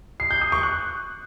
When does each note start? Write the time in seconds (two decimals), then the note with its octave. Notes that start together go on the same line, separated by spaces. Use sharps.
0.20 C7
0.31 G6
0.41 D#6
0.52 C#6
0.63 F#6